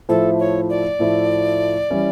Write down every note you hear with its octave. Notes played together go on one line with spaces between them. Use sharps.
A2 F3 A3 E4 A4
C#5
D5
A2 F3 A3 E4
E3 G3 C#4 E4